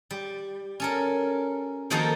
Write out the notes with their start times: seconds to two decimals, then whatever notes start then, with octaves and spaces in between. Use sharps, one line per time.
0.11 G3
0.80 C#4 A4 A#4
1.90 D#3 F3 A#3 D#4 F#4 A4